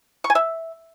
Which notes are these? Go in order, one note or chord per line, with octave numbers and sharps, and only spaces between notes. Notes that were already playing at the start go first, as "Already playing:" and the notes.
C#6
G#5
E5